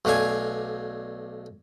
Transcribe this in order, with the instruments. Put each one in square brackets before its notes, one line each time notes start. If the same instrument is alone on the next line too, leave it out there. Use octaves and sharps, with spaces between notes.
[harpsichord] B1 A3 D4 F5 G#5